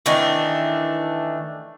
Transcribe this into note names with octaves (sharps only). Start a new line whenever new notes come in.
D#3 E3 A3 D4